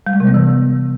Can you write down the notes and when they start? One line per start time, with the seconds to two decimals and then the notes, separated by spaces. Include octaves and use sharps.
0.07 G3
0.13 G#3
0.20 C3
0.27 B3
0.34 E3